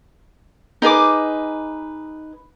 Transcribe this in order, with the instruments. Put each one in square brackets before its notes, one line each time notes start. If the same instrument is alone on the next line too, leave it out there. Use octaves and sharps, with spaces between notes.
[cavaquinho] D#4 G#4 B4 D6